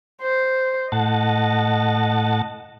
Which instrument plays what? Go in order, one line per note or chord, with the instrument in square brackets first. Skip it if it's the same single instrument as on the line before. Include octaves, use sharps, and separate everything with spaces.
[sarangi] C5
[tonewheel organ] A2 F#5 A5 [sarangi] D#5